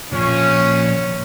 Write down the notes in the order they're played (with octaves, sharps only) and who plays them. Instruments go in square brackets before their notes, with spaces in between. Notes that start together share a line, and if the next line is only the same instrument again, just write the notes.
[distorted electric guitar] A#2 F3 [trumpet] C#4 [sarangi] C#5